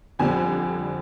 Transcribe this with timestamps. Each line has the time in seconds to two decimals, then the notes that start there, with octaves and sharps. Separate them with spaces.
0.19 F2 D3 G3 C4 G#5